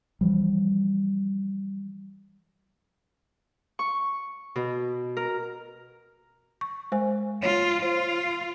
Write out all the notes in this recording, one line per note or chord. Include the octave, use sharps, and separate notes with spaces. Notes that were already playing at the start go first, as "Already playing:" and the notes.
E3 F3 G3
C#6
B2
A#4
C#6
G#3 C5 G#5
F4 C#5
F4 C5 F5